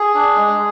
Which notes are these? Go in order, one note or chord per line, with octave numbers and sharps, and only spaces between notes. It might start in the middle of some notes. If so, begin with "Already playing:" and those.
Already playing: G#4
D4
G#3